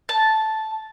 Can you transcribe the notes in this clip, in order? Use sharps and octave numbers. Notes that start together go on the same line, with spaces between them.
A5